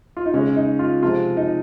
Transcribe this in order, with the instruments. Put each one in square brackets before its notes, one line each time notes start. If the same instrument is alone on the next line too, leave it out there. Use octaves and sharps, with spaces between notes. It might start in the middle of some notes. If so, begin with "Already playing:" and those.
[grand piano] F4
D#4
C#3 G#3 C#4
D#4
F4
C3 F3 G#3 F4
D#4